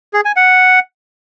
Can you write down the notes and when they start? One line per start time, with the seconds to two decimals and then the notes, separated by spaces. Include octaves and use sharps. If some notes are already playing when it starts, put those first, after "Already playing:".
0.14 G#4
0.25 G#5
0.36 F#5